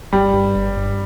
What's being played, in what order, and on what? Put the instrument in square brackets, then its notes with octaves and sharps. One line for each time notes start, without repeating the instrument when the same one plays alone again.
[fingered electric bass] G1 [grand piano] G3
[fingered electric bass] G2
G1
G2